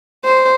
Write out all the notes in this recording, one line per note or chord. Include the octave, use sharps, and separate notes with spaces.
C5